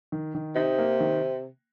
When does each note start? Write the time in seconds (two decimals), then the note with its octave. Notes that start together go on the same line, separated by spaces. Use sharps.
0.12 D#3
0.35 D#3
0.55 C3 D#4
0.79 A#3
1.00 D#3